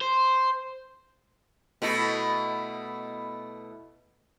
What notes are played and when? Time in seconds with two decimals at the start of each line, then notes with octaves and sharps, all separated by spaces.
0.01 C5
1.82 B2 A3 E4